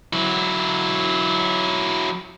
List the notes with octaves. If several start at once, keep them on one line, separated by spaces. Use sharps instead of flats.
F#3 E4